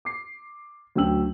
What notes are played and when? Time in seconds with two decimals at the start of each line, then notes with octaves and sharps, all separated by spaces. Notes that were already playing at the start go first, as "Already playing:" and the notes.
0.05 D6 C7
0.95 D2 F#3 C#4 G5 E6 F#7